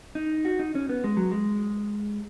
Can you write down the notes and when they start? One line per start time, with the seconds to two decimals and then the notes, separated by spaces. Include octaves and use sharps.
0.15 D#4
0.45 F#4
0.59 D#4
0.75 C#4
0.89 B3
1.04 G#3
1.17 F#3
1.31 G#3